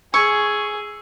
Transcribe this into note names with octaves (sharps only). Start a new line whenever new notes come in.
G#4 C#6 E6 G#6